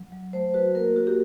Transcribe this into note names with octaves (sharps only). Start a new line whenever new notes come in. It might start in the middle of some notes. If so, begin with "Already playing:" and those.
Already playing: F#3
F#3
A3 C5
F#4 B4
A#3 A#4
A#3 F#4
G4